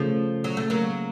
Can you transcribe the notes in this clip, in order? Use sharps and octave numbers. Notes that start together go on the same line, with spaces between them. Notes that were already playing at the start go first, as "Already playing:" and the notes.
Already playing: C#3 F3 A3
F#3
A3
F#3 A#3